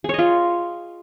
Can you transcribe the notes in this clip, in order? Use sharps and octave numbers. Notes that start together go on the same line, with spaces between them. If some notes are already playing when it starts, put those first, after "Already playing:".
F4 G#4 C#5 D#5